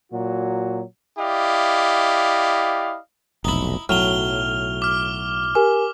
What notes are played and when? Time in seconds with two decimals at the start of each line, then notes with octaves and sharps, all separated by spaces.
0.12 A#2 F#3 F#4
1.18 E4 G4 D5 D#5 F5
3.45 F1 B1 D#4 E4
3.89 B1 A2 F#3 F6 F7 G7
4.82 D6 F6
5.55 G4 A#4 G#5 D6